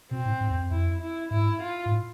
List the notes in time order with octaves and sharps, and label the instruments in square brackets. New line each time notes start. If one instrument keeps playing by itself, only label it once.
[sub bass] B2 [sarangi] C4
[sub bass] A2
G#2
E2
F2
[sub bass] F2 [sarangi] E4
[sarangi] E4
[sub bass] G#2 [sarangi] E4
[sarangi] F4
[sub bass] G#2
A2